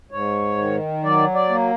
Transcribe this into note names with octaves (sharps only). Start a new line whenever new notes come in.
G#2 C#5
D#3
F#3 D5
D5
A#3